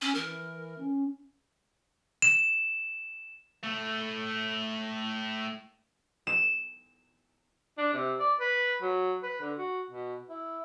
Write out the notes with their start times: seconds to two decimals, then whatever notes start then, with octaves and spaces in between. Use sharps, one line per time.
0.02 C#4
0.15 E3 A#4
0.78 C#4
2.22 E7
3.63 A2 A3
6.27 E7
7.78 D4
7.94 C3
8.20 D5
8.40 B4
8.82 F#3
9.23 B4
9.41 D3
9.57 F#4
9.91 B2
10.30 E4